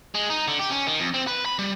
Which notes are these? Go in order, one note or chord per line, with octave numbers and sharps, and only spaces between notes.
G#3
D#4
D3
G4
C#4
D#3
F2
C4
B4
B5
G3